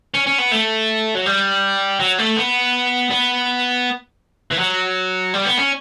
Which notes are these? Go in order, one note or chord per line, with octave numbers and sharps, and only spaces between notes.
C#4
C#4
B3
A3
F#3
G3
F#3
A3
B3
B3
E3
F#3
G3
B3
C#4